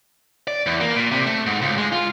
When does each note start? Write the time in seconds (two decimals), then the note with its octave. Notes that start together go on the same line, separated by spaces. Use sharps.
0.47 D5
0.66 E2
0.81 A#3
0.96 A#2
1.11 C3
1.26 A3
1.46 G#2
1.62 C#2
1.78 G#3
1.92 F4